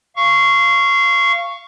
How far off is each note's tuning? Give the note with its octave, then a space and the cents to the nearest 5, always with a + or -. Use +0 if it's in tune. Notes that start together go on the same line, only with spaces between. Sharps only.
F5 -25 C#6 +0